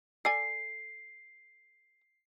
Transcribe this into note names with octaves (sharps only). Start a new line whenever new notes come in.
A4 D5 G#5 C7